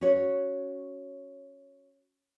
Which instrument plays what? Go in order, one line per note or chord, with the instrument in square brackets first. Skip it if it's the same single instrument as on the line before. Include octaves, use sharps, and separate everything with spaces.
[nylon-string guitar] C#4 F#4 C#5